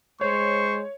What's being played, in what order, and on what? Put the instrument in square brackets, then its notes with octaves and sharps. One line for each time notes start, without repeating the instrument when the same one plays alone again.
[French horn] G#3 [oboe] C5 [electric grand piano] C#5 [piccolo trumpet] C#6